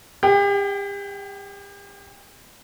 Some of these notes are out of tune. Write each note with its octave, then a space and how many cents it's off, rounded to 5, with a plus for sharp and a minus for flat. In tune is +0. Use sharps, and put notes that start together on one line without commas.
G4 +40 G5 -25